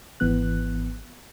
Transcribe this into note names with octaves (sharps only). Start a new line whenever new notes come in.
G#1 E3 B3 F#6